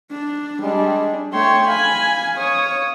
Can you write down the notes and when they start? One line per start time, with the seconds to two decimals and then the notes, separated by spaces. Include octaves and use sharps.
0.11 D4
0.63 G3 G#3 D4
1.33 A3 C#5 G5 C6
1.68 F5 G#5 B5
2.38 C#5 D#6